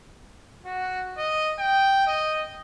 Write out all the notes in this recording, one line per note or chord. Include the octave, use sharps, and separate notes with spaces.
F#4
D#5
G5
D#5